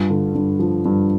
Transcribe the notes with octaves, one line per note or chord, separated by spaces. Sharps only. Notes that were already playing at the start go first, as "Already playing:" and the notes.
Already playing: G2 F4
D3
G2
F3
G2